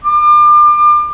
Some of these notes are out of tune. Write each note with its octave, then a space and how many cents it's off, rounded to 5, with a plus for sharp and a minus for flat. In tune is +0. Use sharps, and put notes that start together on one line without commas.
D6 +35